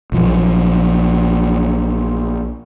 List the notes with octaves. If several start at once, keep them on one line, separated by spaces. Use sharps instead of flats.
A#1 F3 F#3